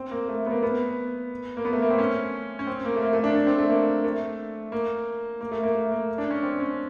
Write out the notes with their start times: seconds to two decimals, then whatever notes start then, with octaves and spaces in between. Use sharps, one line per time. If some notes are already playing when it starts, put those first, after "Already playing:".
Already playing: C4
0.11 A#3
0.28 A3
0.46 B3
0.51 A#3
0.63 B3
1.57 A#3
1.65 B3
1.73 A3
1.82 A#3
1.90 C4
1.99 C#4
2.59 C#4
2.67 C4
2.85 A#3
2.96 A3
3.02 A#3
3.13 A3
3.24 D4
3.35 D4
3.47 C4
3.58 A3
3.70 A#3
4.04 A3
4.72 A#3
5.41 A#3
5.52 A3
5.63 A#3
5.75 A3
5.91 A#3
6.18 D4
6.31 C#4
6.43 C4
6.60 C#4